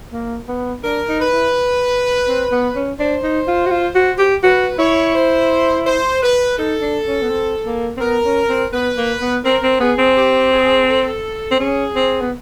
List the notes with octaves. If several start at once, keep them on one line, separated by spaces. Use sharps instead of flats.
A#3
B3
D4 A#4
D#4
B4
E4
C4
B3
C#4
D4 C5
D#4
F4
F#4
F4
F#4
G4
F#4 B4
E4 C#5
C5
C5
B4
D#4 A4
D4
C#4
B3
C4
A#3
C4
B3 A#4
C#4
C4
B3 B4
A#3
B3
C4 A#4
C4
B3 G#4
C4
G4
G#4
A4
C4
C#4 G#4
C4
B3